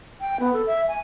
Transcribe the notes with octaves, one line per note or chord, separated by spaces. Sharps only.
G5
B3
A4
E5
G#5